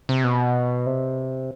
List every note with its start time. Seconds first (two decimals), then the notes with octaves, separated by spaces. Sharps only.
0.09 C3
0.24 B2
0.86 C3